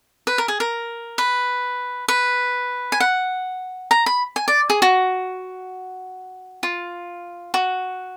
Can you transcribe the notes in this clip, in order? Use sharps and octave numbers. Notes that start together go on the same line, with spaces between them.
B4
A#4
G#4
A#4
B4
B4
G#5
F#5
A#5
B5
G#5
D5
G#4
F#4
F4
F#4